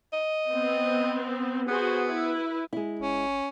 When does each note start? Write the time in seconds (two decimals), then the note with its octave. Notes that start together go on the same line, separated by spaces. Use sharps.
0.13 D#5
0.52 B3 C4
1.68 B3 F#4 G#4 C5
2.07 E4 B4
2.73 G#3 E4
2.99 F#1 C#4